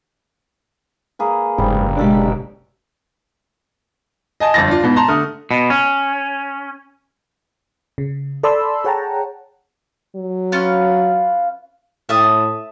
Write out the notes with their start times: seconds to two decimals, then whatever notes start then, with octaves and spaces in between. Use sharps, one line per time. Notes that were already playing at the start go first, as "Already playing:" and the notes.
1.19 A#3 G#4 B4
1.58 F#1 G#2 G3
1.97 B2 G#3 C#4 D4 G4 A4 B5
4.40 D#5 G#5 A5
4.54 G1 F2 A6 A#6
4.68 D4 F4
4.82 G#2 B2 B3
4.96 A5 A#5 C6
5.08 D3 A3 D#6 F6
5.51 B2
5.70 C#4
7.98 C#3
8.43 A4 D5 A5 B5 C6 E6
8.84 G#4 C#5 F#5 G5 A5 A#5
10.16 F#3
10.52 C#4 F4 B4
12.09 A2 E5 A5 D#6